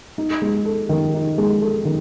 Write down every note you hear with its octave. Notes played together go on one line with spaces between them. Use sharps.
D#4
G#3
A4
D#3
D#4
G#3
A4
D#3